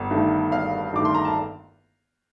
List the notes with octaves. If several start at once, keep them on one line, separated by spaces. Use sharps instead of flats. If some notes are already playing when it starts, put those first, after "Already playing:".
Already playing: G1
G2 D#3 A3
G1 F5
G2 D#3 A3 D6
C6
A#5
A5